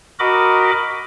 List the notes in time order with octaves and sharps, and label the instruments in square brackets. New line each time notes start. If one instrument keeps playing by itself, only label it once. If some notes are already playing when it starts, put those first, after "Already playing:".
[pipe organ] F#4 A#4 D#5 B5 D6